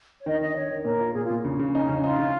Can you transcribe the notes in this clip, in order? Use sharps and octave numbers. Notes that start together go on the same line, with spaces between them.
C#5
D#3 D#5
D#3 D#5
D#3 C#5
D#3
A#2 A#4
F4
A#2 G#4
F4
A#2
C#3
C#3
C#4 D#4
C#3 C#4
D#4 F4
C#3